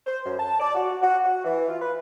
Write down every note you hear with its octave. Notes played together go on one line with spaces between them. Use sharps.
C5
F#2
A5
D5
F#4
F#4
F#4
E3
F4
B4